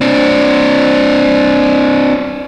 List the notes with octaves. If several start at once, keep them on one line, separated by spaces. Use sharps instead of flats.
C4 D4